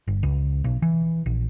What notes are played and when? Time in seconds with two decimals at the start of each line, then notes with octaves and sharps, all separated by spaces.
0.07 G1
0.23 C#2
0.64 B1
0.82 E3
1.26 A#1